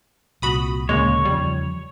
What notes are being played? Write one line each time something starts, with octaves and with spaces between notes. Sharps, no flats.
C2 A#2 F#4 B5 D#6
D2 A#2 C#3 G#3 A#3 C#5
E2 C#3 F3 G3